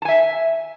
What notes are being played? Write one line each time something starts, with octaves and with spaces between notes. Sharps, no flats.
E5 G#5 A5